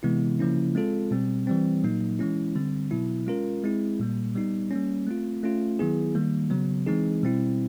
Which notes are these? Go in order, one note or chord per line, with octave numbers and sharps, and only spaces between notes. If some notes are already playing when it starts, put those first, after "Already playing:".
C3 E3 G#3 B3 E4
C#3 F3 A#3 C#4 E4
G#3 C4 F4 A4
B2 G3 C4
E3 G3 C4
A#2 F#3 A#3 D#4
E3 G#3 C#4 E4
D3 G3 C4
B2 F#3 B3 E4
G#3 C#4 F4 A#4
G#3 C4 E4 G#4
A#2 G3 A#3
G3 B3 D#4
G3 A#3 C#4
A3 C4 F4
A3 C#4 F4
D#3 F#3 B3 E4 G#4
D#3 G3 A#3
C#3 F#3 B3
E3 G#3 C4 D#4 G#4
B2 G3 C4 E4